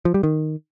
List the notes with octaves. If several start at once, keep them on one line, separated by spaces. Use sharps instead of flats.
F3
G3
D#3